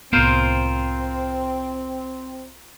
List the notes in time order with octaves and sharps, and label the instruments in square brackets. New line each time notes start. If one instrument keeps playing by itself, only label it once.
[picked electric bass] C2 A2 B3 [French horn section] C4 [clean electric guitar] F4 A#4 C5